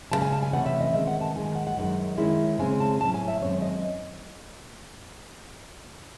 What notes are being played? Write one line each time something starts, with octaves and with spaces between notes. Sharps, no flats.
F#2 C#3 G#3 A5
G#5
A5
G#5
C3 E3 A3 C#4 F#5
E5
D#5
D#3 G#3 C4 E5
F#5
A5
D#3 G#3 D#4 G#5
G#5
F#5
F#5
F#2 D#3 G#3 D#4
D#3 G#3 C#4 E4
C#3 G#3 C4 G#5
A5
A2 F#3 C#4 A5
G#5
E5
F#2 D#3 G#3 C4 D#4 C#5
D#5